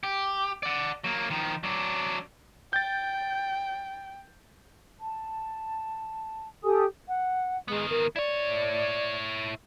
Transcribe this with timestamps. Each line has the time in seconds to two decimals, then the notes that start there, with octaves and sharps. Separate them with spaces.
0.03 G4
0.63 D5 F#5
1.04 F#3 A#3
1.30 D#3 F3
1.64 F#3 D4
2.73 G5 G6 A6
4.99 A5
6.64 G4 A4 G#5 D#6
7.08 F#5
7.68 D#3 G#3 B3
7.90 A#4
8.16 E4 C#5 D5